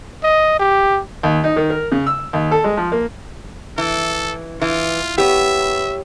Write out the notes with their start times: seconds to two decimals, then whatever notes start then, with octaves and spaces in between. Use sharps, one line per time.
0.24 D#5
0.60 G4
1.23 D#2
1.44 D#4
1.56 D#3
1.70 A#4
1.92 C#3
2.06 E6
2.33 D#2
2.51 A4
2.64 G#3
2.77 F3
2.92 A#3
3.78 E3 A4
4.61 E3 F4
5.18 B3 G4 C#5 E5